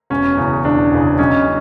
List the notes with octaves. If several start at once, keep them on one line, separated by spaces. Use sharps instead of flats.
E1 C#4
E2 C#3
E1 D4
E2 C#3
B1 C#4